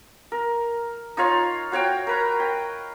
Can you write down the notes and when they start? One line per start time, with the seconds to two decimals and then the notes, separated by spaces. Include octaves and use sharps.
0.32 A#4
1.17 D#4 F4 C#5 F5
1.72 F#4 C#5 F5 G5
2.07 A#4 B4 A#5
2.40 G5